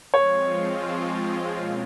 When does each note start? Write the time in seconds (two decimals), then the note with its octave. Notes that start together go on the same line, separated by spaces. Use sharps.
0.14 F3 G#3 C4 F4 C#5
1.55 B2 A#3 C#4